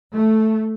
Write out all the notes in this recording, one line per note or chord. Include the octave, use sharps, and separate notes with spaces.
A3